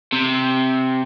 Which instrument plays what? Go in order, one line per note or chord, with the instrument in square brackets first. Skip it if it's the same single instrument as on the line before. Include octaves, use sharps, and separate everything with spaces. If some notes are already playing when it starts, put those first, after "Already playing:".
[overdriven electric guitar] C3